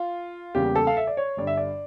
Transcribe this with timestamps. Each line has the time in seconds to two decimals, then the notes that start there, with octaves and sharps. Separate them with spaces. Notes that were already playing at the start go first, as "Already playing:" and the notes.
Already playing: F4
0.54 E2 C#3 G3 A#3 G4
0.76 A4
0.87 F5
0.97 E5
1.07 D5
1.17 C#5
1.37 G1 G2 D3 D5
1.47 E5
1.57 D5